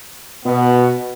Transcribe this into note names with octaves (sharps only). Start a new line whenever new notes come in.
B2 B3